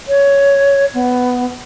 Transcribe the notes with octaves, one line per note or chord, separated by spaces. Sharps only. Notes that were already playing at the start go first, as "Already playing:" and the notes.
C#5
B3